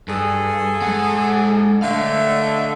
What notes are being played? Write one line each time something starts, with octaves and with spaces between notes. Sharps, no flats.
G2 G#4 A4
G#3 F#5
D3 A3 E5 F5